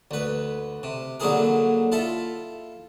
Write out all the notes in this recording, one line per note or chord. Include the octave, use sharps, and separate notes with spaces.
D2 B4
C3
D3 F#3 A#3 E4 G#4 A#4
E4 F4 A4 E5